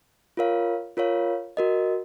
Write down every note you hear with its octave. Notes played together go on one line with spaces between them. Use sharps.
F4 A#4 C#5 F5
F4 A#4 C#5 F5
F#4 A#4 D#5